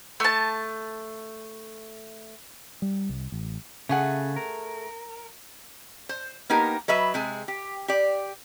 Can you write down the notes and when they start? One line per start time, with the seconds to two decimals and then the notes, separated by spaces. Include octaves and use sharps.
0.20 A3 A5
2.82 G3
3.09 C2
3.32 A1
3.89 C#3 A3 G#4 F#5
4.36 A#4
6.09 C5
6.50 A#3 B3 D#4 G4 A#4
6.88 F#3 B4 D#5 E5
7.14 C3 G#3 G#4
7.48 G4
7.88 G4 D5